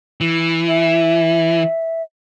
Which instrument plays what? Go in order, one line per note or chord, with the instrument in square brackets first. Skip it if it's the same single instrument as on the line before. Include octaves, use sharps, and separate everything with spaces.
[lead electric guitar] E3
[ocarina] E5